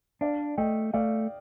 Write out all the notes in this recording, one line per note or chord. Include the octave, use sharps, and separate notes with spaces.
D4 D5 F5
A3 D#5 G5
A3 D5 F5